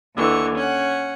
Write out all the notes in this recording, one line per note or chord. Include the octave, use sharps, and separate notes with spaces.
D#2 D3 E3 C#6
C#4 F#5